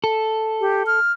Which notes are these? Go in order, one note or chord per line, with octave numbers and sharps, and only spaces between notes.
A4
G4
F6